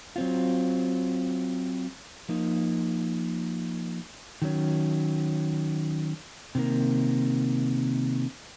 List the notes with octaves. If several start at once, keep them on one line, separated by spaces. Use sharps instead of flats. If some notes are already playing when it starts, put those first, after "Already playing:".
F#3 C4 F4
F3 A#3 D#4
D#3 F#3 C#4
C3 D#3 A#3